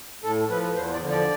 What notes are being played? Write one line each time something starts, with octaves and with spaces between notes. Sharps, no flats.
A2 A4
F3 B4
E2 C5
D5
D3 F3
D5